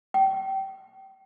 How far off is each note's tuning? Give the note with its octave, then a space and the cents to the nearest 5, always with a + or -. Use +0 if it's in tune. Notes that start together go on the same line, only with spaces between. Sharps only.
G5 -25